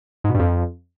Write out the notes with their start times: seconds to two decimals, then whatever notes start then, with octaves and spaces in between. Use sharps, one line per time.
0.24 G#2
0.29 B2
0.35 G2
0.40 F2